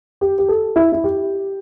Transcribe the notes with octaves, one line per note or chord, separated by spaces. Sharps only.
G4
G4
A4
E4
E4
G4